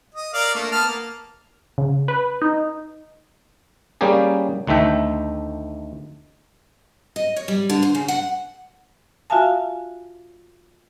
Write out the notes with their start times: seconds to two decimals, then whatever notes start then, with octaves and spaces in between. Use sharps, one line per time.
0.14 D#5
0.34 A#4 D5 F5
0.55 A3 A#3 D4
0.72 B3 A5 F6
0.86 A#3
1.78 C#3
2.08 B4
2.42 D#4
4.01 G3 A#3 C#4 G4 G#4
4.67 D2 D#3 A3 E5 G5
7.16 D#5
7.36 C#5
7.48 G3
7.70 D3
7.83 C5
7.95 C#3
8.08 F#5
9.30 F4 F#4 E5 F5 G#5 A5